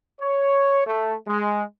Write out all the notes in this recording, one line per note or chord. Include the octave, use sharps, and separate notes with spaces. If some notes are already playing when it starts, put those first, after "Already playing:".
C#5
A3
G#3